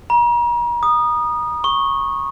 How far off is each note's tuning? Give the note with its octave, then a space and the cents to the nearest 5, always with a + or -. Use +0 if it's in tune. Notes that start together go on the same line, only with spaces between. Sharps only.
A#5 +40
D#6 -20
C#6 -10